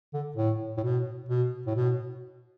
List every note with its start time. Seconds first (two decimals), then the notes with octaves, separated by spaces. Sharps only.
0.14 D3
0.36 A2
0.77 A2
0.83 B2
1.29 B2
1.66 A2
1.75 B2